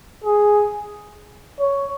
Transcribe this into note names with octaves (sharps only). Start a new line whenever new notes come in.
G#4
C#5